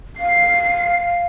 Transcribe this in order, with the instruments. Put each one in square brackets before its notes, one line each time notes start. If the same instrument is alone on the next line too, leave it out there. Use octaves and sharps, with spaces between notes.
[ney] F5 [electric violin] C7